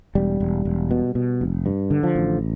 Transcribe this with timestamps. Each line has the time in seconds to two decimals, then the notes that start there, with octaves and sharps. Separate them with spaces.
0.15 E1 G3
0.40 E1
0.65 E1
0.91 B2
1.15 B2
1.41 F1
1.66 G2
1.91 D3
2.03 F3
2.15 A1